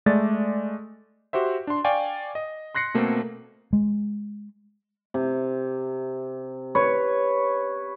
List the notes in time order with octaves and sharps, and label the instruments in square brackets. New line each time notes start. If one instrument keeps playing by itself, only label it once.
[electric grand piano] G#3 A3 D5 A6
F#4 G4 C5 E5
D4 C6
D5 F5 G5 G#5 C#6
D#5
C6 F#6 A#6 C7 C#7
B2 A3 A#3 C4
[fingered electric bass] G#3
[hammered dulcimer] C3
B4 C#5